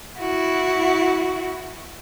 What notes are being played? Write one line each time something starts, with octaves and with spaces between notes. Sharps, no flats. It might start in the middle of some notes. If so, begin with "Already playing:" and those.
E4 F#4